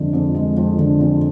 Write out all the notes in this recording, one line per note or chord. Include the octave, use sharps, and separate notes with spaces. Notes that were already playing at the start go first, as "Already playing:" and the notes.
Already playing: F2 D3 G#3
F2
G#3
F2
D3
F2